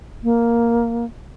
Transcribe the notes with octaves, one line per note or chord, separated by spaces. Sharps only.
A#3